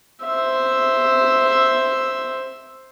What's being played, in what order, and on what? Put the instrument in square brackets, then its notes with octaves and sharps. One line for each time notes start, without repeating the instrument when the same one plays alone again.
[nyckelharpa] C5 E5